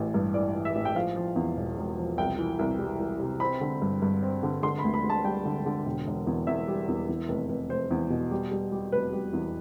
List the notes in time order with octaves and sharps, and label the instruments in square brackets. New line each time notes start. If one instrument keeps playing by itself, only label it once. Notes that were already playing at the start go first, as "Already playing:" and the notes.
Already playing: [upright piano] A1 E3
G2
E3 D5
E3
E5
A1
G5
F3 F5
F3
E2
E1
E1
F3
C2 G5
E3
C2
G3
E3
C3
C4 B5
D3
G2
G2
C4
D3
D3 C6
B5
D2
B5
D2
A5
G3 G5
D3
D3
E1
E1
E2
E2 E5
G3
E2
E2
F1
F1
F1 C5
E2
B2
G3
G3
G3
F1 B4
G3
E2